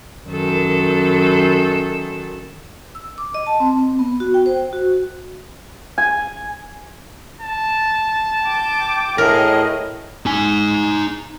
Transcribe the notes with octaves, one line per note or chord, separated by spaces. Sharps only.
F#2 D#3 A4
E6
D6
D#5
A5
C4
C4
B3
F#4
G5
C5
F#4
G#5
A5
G5 D6
A2 G#4 A#4 D#5
D#4 G#5